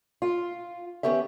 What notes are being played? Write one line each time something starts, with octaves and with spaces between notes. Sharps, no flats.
F4
D#3 B3 C#4 G4 E5